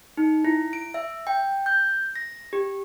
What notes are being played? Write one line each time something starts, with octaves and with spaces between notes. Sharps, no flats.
D#4
E4
D7
E5
G5
G6
A#6
G4